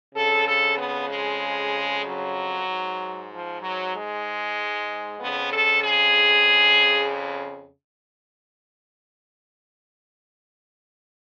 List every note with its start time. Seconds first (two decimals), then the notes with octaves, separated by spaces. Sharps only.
0.15 F2 C#3 A4
0.47 A4
0.78 B3
1.10 G#3
2.05 F#3
2.67 G#2
3.31 F3
3.62 F#3
3.94 G#3
5.20 F2 C#3 B3
5.52 A4
5.83 G#4